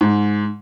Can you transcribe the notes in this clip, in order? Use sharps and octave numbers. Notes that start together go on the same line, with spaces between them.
G#2